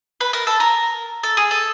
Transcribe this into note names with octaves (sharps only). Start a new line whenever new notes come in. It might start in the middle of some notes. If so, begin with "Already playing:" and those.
B4
A#4
A4
A#4
A4
G#4
A4